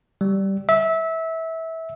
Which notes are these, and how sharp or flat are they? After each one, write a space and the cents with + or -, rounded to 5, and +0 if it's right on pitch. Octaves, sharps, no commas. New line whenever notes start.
G3 -10
E5 -20